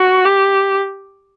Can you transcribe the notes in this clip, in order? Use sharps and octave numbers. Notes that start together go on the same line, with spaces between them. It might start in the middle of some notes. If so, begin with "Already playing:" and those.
Already playing: F#4
G4